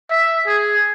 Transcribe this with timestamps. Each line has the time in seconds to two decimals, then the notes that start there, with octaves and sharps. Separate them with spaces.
0.11 E5
0.47 G#4